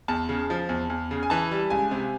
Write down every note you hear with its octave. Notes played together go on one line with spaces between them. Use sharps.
E2 A5
C#3
F3
E2
E2
C#3
G#5
E3 A5
G3
C#2 G#5
C3